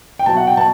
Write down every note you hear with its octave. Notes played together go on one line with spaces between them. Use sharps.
G5
B2 F#3 A5
F#5
G5
B2 A5